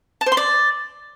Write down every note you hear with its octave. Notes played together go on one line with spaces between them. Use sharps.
A5
C5
C6
D5